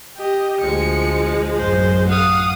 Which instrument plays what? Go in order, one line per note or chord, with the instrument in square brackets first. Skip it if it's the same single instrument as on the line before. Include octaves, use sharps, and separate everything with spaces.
[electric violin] G4 D#5
[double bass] D2 [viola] F3 G#3 [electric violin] C#7
[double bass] A1 F#2 [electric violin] C5
[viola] F5 [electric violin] F#5 D#6